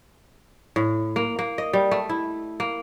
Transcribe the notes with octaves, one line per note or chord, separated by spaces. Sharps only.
A2
A#3
A#3
D#5
G3
A3
E4
A#3